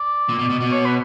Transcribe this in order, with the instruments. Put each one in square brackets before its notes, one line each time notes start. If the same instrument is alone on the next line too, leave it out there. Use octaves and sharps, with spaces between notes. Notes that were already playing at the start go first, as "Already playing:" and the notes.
Already playing: [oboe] D5
[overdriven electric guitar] A#2
B2
B2
B2
[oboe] C#5
B4